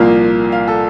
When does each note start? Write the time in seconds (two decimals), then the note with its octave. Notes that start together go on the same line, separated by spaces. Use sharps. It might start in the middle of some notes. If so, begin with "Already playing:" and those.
Already playing: C2 A#2 F3 A#3 F5
0.52 F5
0.68 A4